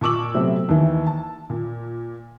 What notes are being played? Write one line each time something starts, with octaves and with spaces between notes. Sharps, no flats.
A#2 A5 C#6 D6 E6 F#7
C3 F#3 A3 B3 C4
D#2 E3
A5
A#2